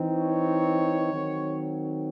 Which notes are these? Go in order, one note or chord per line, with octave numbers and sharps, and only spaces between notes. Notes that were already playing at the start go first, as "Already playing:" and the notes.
Already playing: E3 C4 D#4
C#5
D#3 F#3 C4